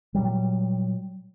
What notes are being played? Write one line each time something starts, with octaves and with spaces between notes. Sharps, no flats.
A#2 F#3 G3